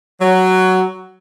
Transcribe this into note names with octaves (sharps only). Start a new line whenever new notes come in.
F#3